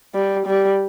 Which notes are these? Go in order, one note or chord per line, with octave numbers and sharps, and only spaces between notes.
G3
G3